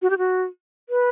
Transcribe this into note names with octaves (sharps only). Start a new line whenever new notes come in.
F#4
G4
F#4
B4